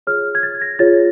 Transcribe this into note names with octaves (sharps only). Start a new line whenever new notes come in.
F4 G#4 C#5 F6
G#6
A6
A#6
F4 G#4 C#5 A6